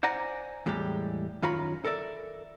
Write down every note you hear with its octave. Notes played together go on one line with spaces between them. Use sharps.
C5 D5 F#5 G#5 A#5
E2 A2 G3 G#3 G4
F#2 D#3 F4 C#5 A#5 B5
A4 A#4 D5 E5